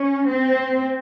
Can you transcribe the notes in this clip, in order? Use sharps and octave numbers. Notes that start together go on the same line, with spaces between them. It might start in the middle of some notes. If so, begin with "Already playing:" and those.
Already playing: C#4
C4